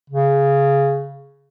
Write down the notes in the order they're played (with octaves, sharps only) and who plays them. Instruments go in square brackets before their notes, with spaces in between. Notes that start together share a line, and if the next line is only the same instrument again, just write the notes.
[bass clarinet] C#3